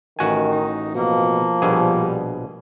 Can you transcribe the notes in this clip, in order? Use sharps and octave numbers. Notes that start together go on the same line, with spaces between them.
A1 D#3 F#4 G#5
D#4
B2 F3 A#3
A#1 B2 G3 G#4